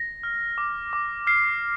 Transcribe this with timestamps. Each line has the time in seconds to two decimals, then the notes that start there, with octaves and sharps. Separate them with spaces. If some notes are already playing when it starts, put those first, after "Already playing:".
Already playing: A#6
0.23 F6
0.58 D6
0.93 D6
1.27 F6 C7